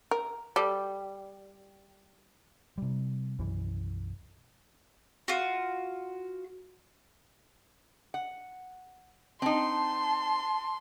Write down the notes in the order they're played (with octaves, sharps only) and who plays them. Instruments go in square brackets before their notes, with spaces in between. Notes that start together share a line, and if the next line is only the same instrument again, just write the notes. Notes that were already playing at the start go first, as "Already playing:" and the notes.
[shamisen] A#4
[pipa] G3 [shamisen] A4
[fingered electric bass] C3 G3
B1 F#2 E3
[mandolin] F4 F#4
[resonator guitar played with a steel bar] F#5
[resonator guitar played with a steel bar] C4 D#4 [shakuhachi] A5 [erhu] C6